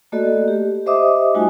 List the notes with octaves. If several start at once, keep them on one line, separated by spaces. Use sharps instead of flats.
A3 A#3 F#4 A4 D5 D#5
G4
G4 C5 D#5 E5 D6 D#6
G3 A3 D#4 F4 F#4 G#5